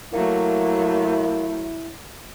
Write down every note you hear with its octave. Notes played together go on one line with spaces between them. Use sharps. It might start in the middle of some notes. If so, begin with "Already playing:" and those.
F#3 A3 A#3 E4